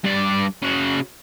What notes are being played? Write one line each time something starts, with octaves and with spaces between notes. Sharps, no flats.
G2 D5
C#3 F#4